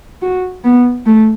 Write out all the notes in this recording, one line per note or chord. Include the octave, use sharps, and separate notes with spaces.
F#4
B3
A3